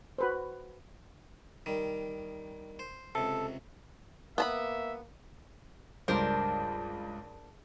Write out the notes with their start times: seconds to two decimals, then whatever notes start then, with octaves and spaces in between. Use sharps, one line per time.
0.18 F#4 B4 C5
1.66 D#3 G3
2.79 C5
3.15 C#2 C3 A4
4.38 A#3 B3 E5 A5 B5
6.08 C#2 G2 D4 A#4 C5